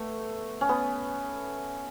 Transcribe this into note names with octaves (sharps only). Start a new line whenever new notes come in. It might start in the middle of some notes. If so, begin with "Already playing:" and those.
Already playing: A3 B3
C#4
B3